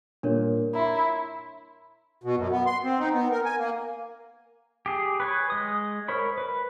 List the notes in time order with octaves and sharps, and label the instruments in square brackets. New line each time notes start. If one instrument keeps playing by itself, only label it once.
[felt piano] A#2 G3 [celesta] D4 A#4 C#5
[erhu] E4 [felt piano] A#5 C6
[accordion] B2
F#2
B3
C6
C4
D#4
B3
A#4
G#5
A#3
[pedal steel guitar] G4 G#4
B4 C#5 G#5
G#3 D#6
A#4 C5 C#5 B5
B4